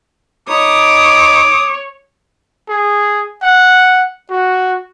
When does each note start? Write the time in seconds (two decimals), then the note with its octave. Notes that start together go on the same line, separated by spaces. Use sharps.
0.49 D#4 C#5 B5 D6 D#6
2.69 G#4
3.43 F#5
4.30 F#4